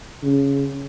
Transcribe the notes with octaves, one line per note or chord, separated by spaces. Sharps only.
C#3